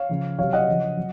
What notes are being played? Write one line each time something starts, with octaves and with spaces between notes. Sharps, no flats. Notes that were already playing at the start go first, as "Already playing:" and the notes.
Already playing: C#5 F5
C#3 F3
C3 F#3 C#5 F5
D#5 F#5
C#3 F3
F#3